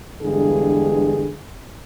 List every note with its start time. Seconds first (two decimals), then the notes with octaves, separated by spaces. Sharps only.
0.22 E2 G2 D3 G#3 G#4